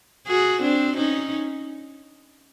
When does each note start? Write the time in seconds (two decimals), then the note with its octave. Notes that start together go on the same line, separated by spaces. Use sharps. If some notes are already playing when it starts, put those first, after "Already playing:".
0.27 F#4 G#4
0.63 C4 D4
0.97 C#4 D#4